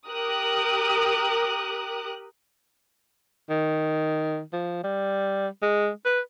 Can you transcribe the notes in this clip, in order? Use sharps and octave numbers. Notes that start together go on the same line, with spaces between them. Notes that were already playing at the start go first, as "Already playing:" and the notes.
G4 A#4 D#6 F#6
D#3
F3
G3
G#3
B4